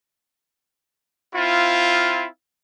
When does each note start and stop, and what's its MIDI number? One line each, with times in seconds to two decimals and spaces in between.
1.34 2.26 60
1.34 2.26 64
1.34 2.26 65